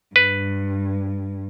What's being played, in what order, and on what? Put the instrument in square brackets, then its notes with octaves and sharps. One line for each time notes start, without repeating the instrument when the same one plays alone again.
[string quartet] G2 [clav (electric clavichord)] B4